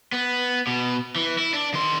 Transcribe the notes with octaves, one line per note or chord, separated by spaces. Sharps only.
B3
B2
E3
E4
D4
D#3 C6